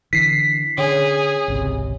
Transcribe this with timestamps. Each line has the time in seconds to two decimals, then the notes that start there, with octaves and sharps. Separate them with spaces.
0.13 D3 E3 B6 C7
0.78 D3 C#4 G#4
1.48 G#1 C#2 C3